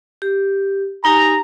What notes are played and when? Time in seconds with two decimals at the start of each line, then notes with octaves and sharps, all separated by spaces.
0.22 G4
1.05 D#4 G4 G#5 A#5